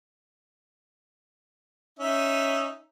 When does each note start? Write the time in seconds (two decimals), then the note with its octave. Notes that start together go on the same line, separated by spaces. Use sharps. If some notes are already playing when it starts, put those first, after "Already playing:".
1.99 C#4 D#4 E5